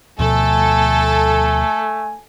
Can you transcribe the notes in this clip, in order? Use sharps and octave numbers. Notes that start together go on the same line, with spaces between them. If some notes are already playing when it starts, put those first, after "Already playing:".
D2 B2 F3 A3 A4 G#5